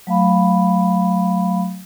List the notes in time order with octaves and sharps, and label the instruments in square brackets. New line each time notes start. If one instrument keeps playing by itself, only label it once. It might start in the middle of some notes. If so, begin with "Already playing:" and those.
[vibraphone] F#3 A3 F5 B5